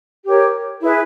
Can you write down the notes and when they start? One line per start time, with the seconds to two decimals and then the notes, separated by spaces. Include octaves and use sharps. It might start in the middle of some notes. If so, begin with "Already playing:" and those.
0.25 G4 A#4 C#5
0.81 E4 G#4 B4